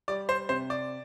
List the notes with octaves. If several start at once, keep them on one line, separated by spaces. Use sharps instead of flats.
G3 D5
C5
C3 C5
D5